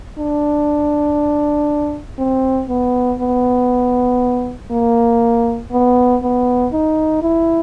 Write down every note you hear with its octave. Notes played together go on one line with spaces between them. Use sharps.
D4
C4
B3
B3
A#3
B3
B3
D#4
E4